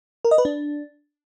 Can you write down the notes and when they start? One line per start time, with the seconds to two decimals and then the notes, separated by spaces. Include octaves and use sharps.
0.25 A#4
0.31 D#5
0.38 B4
0.45 D4